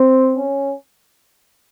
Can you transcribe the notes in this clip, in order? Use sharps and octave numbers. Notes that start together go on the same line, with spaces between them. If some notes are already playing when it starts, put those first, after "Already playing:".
Already playing: C4
C#4